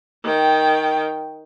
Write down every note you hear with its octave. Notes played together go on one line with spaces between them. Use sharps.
D#3 G5